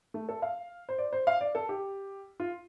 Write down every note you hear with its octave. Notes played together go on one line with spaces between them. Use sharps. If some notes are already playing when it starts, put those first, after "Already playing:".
A3
A4
F5
C5
D5
C5
F5
D5
A4
G4
F4